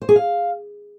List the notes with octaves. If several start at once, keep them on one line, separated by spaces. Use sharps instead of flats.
C5
G#4
F5